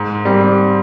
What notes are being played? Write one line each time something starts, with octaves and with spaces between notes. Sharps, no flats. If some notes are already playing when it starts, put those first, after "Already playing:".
Already playing: G#2
G3 C4